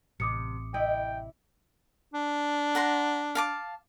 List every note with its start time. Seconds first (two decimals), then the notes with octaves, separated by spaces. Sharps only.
0.20 A1 C3 D6 D#6 C#7
0.74 C3 E4 D#5 G5
2.14 D4
2.75 F#5 A#5 C6
3.35 F5 A5 D6